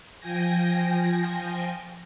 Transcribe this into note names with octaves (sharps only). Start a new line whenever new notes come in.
F3 G5 G#5 A#6